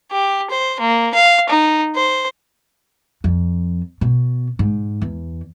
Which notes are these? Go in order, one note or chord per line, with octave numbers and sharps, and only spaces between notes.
G4
C5
A#3
F5
D#4
C5
F2
B2
G#2
E2